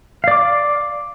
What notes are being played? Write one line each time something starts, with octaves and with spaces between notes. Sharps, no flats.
D5 F5 D6